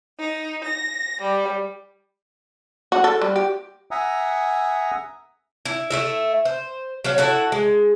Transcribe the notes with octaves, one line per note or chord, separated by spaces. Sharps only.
D#4
A#6
G3
F#4
A4
G3
G4
E5 F#5 G#5 A#5 D#6
E4
A3 E4 E5
C5
F#3 C#5 F5
E4 F#4 A4
G#3